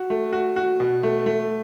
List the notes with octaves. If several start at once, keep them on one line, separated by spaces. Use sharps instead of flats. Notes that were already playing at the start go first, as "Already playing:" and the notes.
Already playing: F#4
A3
F#4
F#4
B2
A3
A3